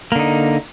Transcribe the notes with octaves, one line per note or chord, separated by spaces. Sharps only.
D3 A#3 D#4